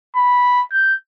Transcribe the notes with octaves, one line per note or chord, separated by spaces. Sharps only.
B5
G6